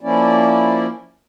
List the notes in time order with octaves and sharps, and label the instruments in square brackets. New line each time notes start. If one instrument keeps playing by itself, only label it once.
[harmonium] F3 A#3 C#4 E4 D5